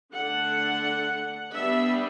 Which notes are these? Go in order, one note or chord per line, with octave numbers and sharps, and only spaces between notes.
D3 A3 D4 F#5
G3 B3 D4 E5